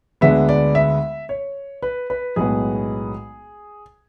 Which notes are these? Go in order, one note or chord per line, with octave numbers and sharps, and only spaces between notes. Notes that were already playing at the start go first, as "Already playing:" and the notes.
D2 D3 G#3 B3 E5
D5
E5
C#5
B4
B4
B1 A2 G#3 B3 G#4